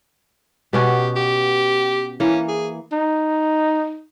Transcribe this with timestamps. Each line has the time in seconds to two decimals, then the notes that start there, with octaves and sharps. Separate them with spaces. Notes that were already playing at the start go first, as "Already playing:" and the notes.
0.73 B2 B3 C#4 G4
1.16 G4
2.20 E3 A#3 C#4
2.48 G#4
2.92 D#4